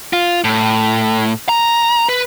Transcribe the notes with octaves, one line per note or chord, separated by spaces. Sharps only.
F4
A2
A#5
B4